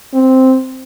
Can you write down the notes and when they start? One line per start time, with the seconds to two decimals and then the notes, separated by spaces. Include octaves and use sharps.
0.14 C4